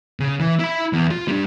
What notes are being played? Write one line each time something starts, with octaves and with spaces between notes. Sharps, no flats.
C#3
E3
E4 B5
E2
F4
G3 D4